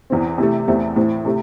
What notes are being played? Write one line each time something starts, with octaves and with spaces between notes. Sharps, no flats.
E2 E3 C4
C3 E3 A3
E2 E3 A3 C4 E4
A2 E3 A3 C4
C3 A3